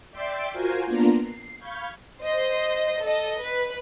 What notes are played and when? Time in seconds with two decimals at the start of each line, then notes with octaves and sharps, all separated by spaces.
0.11 D5 E5 G5 C6 D6
0.52 F4 F#4 A#4 C5 G#5
0.85 A#3 B3 D4 F4 A#5
1.24 C7
1.59 F5 B5 C#6 G6 G#6
2.23 C5 D#5
3.03 A4 D#5
3.43 B4